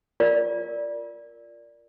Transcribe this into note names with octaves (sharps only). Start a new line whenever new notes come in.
F4 A#4 D5